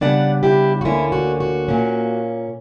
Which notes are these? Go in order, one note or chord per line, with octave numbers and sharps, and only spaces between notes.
C#3 G3 B3 D4 D5 F#5
E4 G4
F#4
D2 D3 A#3 C#4 E4
F#4
F#4
A#2 A#3 C#4